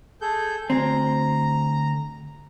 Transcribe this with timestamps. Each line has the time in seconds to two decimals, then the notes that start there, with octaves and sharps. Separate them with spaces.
0.21 G#4 A4 G6
0.70 D2 C4 A#5